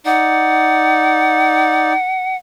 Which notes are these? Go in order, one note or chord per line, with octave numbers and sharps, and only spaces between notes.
D#4 D5 F#5